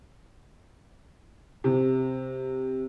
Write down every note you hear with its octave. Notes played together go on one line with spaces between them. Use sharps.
C3